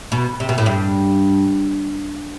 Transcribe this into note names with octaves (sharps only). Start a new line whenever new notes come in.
B2
C3
B2
A2
G2